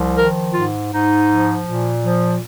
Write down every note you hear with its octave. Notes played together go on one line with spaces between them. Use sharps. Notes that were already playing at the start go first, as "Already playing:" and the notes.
Already playing: C2 F3
D#3 A#4
G#2 F4
G#2 D#4
F3
A#2
F3